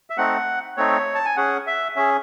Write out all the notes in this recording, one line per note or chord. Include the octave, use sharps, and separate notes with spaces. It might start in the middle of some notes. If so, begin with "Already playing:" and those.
E5
A3 C4 D#4 F#5
A3 C4 D#4 C#5
A5
G#5
C#4 G#4 F#5
E5
C#4 G#4 E5